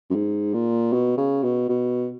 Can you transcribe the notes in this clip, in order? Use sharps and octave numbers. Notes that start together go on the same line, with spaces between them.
F#2
G#2
A#2
B2
C#3
B2
B2